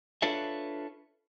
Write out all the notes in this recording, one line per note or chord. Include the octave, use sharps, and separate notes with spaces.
D4 F4 A4 B4 C#5 E5